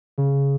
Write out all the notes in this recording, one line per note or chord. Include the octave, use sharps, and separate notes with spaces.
C#3